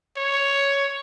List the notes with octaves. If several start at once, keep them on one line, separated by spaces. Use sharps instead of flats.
C#5